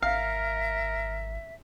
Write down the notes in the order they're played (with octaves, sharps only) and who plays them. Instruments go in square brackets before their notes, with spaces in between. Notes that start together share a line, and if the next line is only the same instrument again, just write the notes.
[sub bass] G#1 [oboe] A#4 [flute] E5 [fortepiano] F5